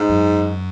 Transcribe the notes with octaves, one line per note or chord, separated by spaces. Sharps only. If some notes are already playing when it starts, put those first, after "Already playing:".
Already playing: G#2
F#2